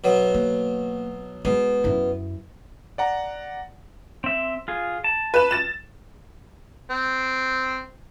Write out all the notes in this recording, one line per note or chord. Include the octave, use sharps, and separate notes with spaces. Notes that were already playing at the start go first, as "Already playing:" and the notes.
B2 F#3
A#3
B2 G#3
F#2 E4
D5 F#5 A#5
C4 E5
F4 G#4
A5
B4 E7
A6 E7
C4